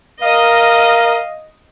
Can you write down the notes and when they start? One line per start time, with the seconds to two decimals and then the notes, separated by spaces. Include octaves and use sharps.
0.22 A#4 D#5 F5